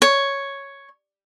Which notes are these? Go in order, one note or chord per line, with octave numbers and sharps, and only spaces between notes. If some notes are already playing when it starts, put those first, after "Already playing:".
C#5